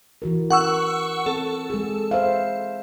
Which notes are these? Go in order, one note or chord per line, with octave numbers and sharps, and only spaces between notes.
E3 F#4 A#4
C#4 A#4 F#5 C#6 E6
C4 A4
G#3 G#4
C5 E5 F5